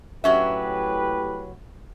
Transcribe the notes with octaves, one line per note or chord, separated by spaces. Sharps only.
A2 F#3 C#4 G4 B4 E5